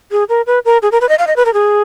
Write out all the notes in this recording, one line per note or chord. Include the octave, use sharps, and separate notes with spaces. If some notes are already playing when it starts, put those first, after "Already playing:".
G#4
A#4
B4
A#4
G#4
A#4
B4
D#5
F5
D#5
B4
A#4
G#4